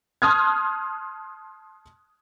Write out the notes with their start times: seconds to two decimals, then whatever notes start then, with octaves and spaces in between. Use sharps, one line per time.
0.22 A5 C6 D#6 F6 F#6 G#6